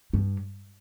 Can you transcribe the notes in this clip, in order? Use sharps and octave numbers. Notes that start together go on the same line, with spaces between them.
G2